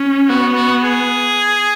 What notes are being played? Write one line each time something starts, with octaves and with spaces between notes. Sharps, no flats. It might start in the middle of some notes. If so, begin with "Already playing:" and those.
Already playing: C#4
B3 F#4
F#4
G#4